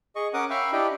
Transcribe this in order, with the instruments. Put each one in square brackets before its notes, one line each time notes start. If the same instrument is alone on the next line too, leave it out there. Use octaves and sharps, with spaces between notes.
[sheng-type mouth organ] G#4 D#5 C#6
C#4 A#4 F#5 D6 D#6
E5 F5 G5 B5 C#6
D4 E4 G4 D#5 G5 B5